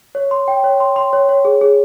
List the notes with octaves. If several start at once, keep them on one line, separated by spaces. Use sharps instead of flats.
C#5
C6
G5
C#5
C6
C6
C#5
C#5
G#4
G#4